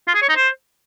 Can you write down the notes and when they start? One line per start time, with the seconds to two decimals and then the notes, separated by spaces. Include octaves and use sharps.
0.08 F4
0.15 G#4
0.22 C#5
0.29 D#4
0.36 C5